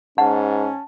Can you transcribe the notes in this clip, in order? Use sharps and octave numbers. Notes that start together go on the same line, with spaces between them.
G#2 C#4 F#5 A5